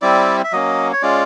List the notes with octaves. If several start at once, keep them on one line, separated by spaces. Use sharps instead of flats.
G3 C4 E4 D5
E5
F#3 A#3 C#4 D#5
C#5
G#3 C#4 F4 D5